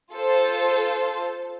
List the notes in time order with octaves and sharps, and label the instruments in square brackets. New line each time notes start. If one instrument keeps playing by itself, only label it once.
[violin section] F4 A4 C5